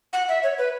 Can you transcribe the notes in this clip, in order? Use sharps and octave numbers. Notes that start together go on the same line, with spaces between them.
F#5
E5
C#5
B4